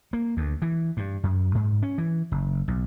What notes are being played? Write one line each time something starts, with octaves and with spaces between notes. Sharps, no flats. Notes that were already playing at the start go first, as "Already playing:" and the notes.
A#3
D2
E3
G2
F#2
G#2
C#4
E3
F#1
B1